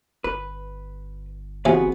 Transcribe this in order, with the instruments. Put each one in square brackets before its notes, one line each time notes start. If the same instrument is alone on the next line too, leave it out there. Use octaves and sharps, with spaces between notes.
[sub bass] G1 [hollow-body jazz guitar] B4
[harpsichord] C3 E3 F3 [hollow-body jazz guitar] B3 C4 G#4 [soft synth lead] F#4